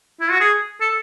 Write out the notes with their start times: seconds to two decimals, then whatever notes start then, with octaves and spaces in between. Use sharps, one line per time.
0.20 E4
0.31 F#4
0.40 G#4
0.81 A4